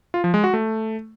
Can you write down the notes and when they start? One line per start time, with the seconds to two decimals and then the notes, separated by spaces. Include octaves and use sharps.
0.14 F4
0.24 F3
0.34 G#3
0.44 F#4
0.54 A3